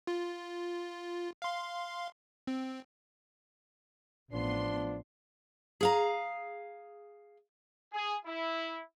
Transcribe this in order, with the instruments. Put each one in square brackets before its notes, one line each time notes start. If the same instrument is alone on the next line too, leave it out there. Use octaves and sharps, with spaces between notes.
[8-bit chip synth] F4
F5 C6
C4
[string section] A1 B3 C6 [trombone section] F3 D4
[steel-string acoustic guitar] G#4 F5 A#5
[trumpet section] G#4
E4